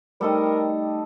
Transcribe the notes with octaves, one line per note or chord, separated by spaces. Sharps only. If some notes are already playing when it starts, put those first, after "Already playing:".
G3 A3 D#4 A4 A#4 D#5 G5